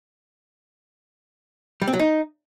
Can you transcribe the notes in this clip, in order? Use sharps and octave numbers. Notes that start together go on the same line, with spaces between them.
G3
C4
F#3
D#4